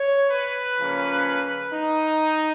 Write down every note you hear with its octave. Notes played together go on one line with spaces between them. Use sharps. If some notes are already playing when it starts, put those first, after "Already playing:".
Already playing: C#5
B4
C#3 F3 A#3 C#4
D#4